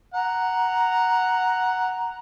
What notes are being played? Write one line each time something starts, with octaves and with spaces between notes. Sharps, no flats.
F#5 A#5